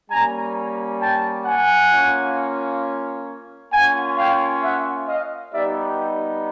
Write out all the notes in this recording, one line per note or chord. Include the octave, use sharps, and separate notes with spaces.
G3 A#3 C#4 G#5 A#5
G5 A5
F#5 G#5
A#3 C#4 F4
A#3 C#4 F4 F#5 G#5
F5 G5
E5 F#5
D#5 F5
G3 B3 D#4 G4 D5 E5